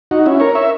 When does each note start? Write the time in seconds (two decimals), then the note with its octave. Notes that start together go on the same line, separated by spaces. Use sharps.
0.11 D#4 F#4
0.26 C#4 E4
0.40 A#4 C#5
0.55 C#5 E5